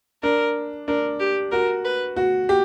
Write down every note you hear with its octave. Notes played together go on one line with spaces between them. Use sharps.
D4 A#4
D4 A#4
G4
F#4 A#4
B4
F#4
G4